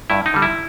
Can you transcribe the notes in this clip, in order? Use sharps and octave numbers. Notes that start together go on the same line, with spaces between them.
G2 E4
D#4
D3 G3
E4